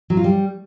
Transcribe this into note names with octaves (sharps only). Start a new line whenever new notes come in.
F#3
F4
G3